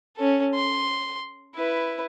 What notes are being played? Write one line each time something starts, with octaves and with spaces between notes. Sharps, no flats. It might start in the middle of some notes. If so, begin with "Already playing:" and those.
C#4 A4
C6
E4 B4